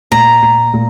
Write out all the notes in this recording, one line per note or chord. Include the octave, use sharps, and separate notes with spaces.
A#2 A#5
A#2
A#2